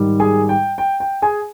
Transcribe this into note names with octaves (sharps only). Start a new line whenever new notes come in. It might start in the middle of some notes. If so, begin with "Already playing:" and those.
Already playing: G#2 D#3 G3
G#4 G#5
G5
G5
G5
G#4 G#5